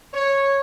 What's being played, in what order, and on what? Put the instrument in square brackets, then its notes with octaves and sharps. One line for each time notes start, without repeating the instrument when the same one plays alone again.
[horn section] C#5